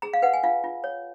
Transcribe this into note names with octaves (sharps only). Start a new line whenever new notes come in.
G#4 A#5
F5
B4 F#5
G#5
F4 F5
F4
C#5